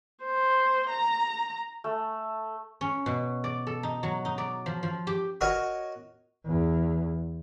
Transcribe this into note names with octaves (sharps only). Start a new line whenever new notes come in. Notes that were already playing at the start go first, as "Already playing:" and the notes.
C5
A#5
A3
C#4
B2
D5
A4
D#4
F#3
D#4
D5
F3
F3
G4
F#4 A#4 C#5 D#5
E2